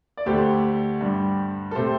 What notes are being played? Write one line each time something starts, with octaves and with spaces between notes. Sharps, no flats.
D5
D2 D3 A3 G4 C5
G2 G3
A4
C3 A3 G4 C5